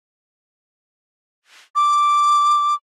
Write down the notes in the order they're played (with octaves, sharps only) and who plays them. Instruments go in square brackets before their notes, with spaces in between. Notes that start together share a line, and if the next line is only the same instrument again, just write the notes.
[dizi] D6